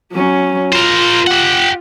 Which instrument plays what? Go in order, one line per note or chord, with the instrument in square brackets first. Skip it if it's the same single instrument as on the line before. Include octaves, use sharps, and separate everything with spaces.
[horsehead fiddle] F#3 C#4
[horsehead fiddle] F4 [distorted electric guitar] A#4 C5
[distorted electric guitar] G4 F#5